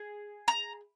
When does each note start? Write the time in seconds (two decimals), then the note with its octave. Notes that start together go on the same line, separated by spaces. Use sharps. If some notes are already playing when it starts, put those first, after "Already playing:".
Already playing: G#4
0.48 A#5